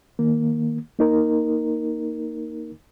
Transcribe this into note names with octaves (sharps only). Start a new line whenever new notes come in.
D#3 A#3
A#3 D#4 A#4